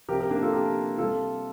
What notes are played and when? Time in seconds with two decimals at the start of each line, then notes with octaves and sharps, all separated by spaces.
0.08 C3 F3 G4 A#4
0.20 G4 A#4
0.31 A#3 D4
0.42 F4 A4
0.53 G4 A#4
0.98 C3 G3 F4 A4